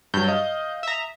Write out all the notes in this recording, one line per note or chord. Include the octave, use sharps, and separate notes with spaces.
G2 F#3 G6
D#5 F5 D#6
E5 A#5